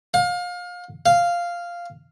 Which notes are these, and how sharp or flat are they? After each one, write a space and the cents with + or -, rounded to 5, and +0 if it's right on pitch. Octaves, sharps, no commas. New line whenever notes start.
F5 +30
F5 -5